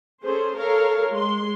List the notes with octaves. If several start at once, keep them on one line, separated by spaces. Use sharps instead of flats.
C#4 G#4 A4 C5
A4 A#4 C#5 F5
G#3 C6